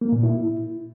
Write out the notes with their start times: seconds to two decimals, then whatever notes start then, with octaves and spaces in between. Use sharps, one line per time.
0.01 A#3
0.12 A#2
0.23 E4